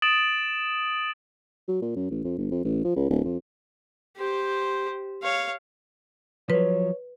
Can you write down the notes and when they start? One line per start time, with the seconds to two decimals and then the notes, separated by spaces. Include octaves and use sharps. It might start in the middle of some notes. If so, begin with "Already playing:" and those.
0.02 D#6 A6 D7 E7 F#7
1.68 F#3
1.82 A#2
1.96 F#2
2.10 A1
2.24 F2
2.38 G1
2.51 F2
2.64 A1
2.84 F3
2.96 C#2
3.10 D1
3.25 F2
4.17 G4 C5
5.23 C#5 F5
6.50 F3 F#3 B4 C#5